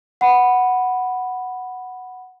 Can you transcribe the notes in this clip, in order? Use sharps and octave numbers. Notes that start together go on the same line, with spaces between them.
F#5 B5